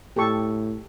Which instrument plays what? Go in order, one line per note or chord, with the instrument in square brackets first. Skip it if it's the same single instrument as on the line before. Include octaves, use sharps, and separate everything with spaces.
[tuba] A2 [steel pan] G4 A4 C#6